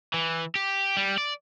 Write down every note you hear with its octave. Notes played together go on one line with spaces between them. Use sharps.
E3
G4
G3
D5